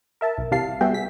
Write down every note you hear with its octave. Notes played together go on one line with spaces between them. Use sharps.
A#4 E5 A5
B1
C3 E3 G3 F5 A5 C7
G3 B3 F#4 G#4 E5 G5
B6